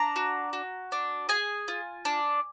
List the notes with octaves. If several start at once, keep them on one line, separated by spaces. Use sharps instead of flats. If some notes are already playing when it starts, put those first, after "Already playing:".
Already playing: D4 A#5
F#4
F#4
D4
G#4 G#5
F4
D4